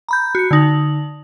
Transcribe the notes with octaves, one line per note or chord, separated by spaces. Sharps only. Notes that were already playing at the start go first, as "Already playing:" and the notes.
A#5 B5 G6
F#4 C#7
D3 D#4 F#7